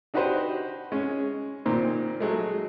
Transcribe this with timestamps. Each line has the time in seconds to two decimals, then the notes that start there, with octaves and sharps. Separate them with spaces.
0.14 D4 D#4 F#4 G4 B4 C5
0.92 G#3 C#4
1.65 A#2 D#3 C4
2.20 F#3 G#3 A3